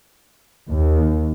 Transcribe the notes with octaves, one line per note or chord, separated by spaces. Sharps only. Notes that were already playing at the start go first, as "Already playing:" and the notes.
D#2